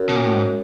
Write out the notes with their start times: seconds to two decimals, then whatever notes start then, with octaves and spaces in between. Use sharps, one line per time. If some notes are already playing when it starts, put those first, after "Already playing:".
Already playing: F#2
0.09 B2
0.16 A#2
0.25 A2
0.33 G#2